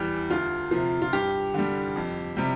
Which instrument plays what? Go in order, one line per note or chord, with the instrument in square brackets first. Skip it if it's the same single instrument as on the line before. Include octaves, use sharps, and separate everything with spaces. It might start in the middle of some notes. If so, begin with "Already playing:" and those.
Already playing: [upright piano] E2 E3 G3 G4
D2 F4
C3 F3
F4
G2 G4
D3 G3
F2
C3 G3